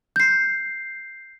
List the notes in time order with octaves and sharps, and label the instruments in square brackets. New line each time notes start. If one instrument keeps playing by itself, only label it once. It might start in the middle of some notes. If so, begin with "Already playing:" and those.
[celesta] G6 C7